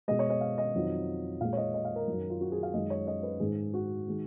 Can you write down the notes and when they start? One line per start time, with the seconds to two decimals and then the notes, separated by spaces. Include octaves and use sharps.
0.08 B2 G#3 D#5
0.19 C#5
0.30 D#5
0.41 F5
0.58 D#5
0.75 F2 D#3 F#3
1.41 A#2 G#3 F5
1.53 C#5
1.57 D#5
1.74 D#5
1.85 F5
1.96 A#4
2.07 F#2 D#3 F#3
2.30 F4
2.41 F#4
2.52 G#4
2.63 F5
2.74 F#2 D#3 G#3 D#5
2.90 C#5
3.07 D#5
3.23 B4
3.40 G#2 D#3 G#3 G#4
3.74 F#4
4.07 D#3 G#3